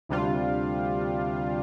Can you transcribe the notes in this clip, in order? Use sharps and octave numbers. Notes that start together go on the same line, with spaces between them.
D2 C3 G3 D4 F4